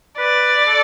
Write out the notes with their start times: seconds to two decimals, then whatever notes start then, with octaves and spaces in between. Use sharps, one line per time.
0.18 B4 D5
0.68 A4